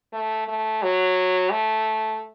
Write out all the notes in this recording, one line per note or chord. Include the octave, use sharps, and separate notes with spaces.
A3
A3
F#3
A3